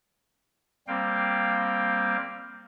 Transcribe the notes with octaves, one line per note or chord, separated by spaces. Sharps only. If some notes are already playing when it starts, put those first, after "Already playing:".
G3 A#3 C4 F5 G5